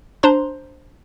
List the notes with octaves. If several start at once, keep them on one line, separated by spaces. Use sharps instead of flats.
D4 C5 A#5 C6